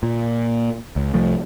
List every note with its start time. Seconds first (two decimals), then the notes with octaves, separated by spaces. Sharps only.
0.03 A#2
0.96 C#2
1.14 C2 F3 A3